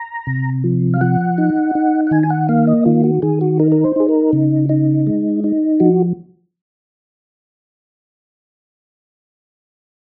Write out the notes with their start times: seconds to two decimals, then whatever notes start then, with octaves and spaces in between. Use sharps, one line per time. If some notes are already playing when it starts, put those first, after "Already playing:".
Already playing: A#5
0.27 C3
0.64 F3
0.94 F5
1.01 F3 F#5
1.38 D#4
1.75 D#4
2.07 F#5
2.11 D#3 G#5
2.23 G#5
2.30 F#5
2.49 A#3 F5
2.67 D#5
2.85 D#3 F4
3.04 F#4
3.22 D#3 G#4
3.41 F#4
3.59 D#4 A#4
3.72 A#4
3.84 C5
3.96 D#4 G#4
4.09 A#4
4.33 C#3
4.69 D#4
5.07 G#3
5.44 D#4
5.80 F3 F#4